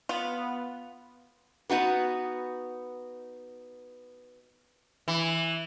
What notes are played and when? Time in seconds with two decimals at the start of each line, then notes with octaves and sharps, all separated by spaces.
0.09 B3 F4
1.70 B3 D#4 F#4 B4
5.08 E3